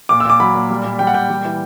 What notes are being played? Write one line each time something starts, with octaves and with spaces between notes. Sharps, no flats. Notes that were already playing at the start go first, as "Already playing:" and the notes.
A#2 D6
E6
A#2 D6
F#3 B5
A#2
G3
A#2
G3 G5
F#5
A#2 G5
G3
E3